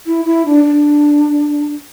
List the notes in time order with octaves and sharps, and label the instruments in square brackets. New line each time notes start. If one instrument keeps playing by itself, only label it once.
[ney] E4
E4
D4
D4